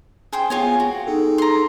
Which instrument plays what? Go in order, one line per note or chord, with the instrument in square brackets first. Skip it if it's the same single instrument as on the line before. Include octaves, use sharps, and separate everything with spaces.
[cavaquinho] G#4 C5 G5
[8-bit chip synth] B3 G#4 [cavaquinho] F4 C#5 G#5
[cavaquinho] F#4 [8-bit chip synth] G5
[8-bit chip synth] D#4 G#4 A4
[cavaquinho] A#5 C6